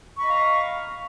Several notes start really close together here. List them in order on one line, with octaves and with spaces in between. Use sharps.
C#6 B5 D#5 F5 A#5